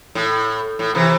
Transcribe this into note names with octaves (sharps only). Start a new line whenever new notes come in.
A2
A2
C3 E3